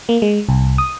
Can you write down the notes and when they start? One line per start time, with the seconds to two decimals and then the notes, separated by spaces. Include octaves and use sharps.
0.09 A#3
0.22 G#3
0.49 C2
0.78 D#6